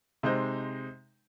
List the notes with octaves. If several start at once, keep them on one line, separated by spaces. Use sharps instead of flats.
C3 G#3 D#4 C5